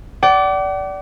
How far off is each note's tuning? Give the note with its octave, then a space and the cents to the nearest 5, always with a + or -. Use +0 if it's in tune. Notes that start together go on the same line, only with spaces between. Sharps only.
D5 -15 F#5 +45